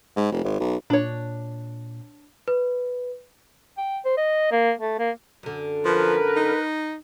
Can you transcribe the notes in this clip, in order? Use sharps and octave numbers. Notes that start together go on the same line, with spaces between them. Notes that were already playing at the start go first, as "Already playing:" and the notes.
G#2
F1
G#1
B1
A#2 D4 C#5
B4
G5
C5
D#5
A#3
A3
A#3
F#2 D3
F3 A#4 B4
D#4